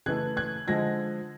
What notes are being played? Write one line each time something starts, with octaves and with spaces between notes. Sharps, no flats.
C#3 E3 A3 F#6 G#6
F#6 G#6
D3 F3 G#3 G#6 A#6